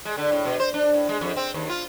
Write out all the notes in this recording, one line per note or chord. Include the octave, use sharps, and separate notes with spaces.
G#3
D3
A2
B2
C5
D4
A2
G#3
F2
C4
D#2
F4